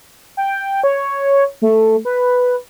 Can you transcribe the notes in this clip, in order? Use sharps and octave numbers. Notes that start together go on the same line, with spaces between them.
G5
C#5
A3
B4